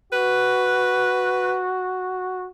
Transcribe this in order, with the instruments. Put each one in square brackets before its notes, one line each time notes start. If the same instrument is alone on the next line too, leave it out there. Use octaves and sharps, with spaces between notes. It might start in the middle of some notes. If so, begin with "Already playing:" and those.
[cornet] F#4 [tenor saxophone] B4